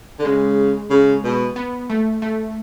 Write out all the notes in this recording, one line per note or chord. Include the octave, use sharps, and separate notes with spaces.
D3
C#3 G#3
C#3
B2
B3
A3
A3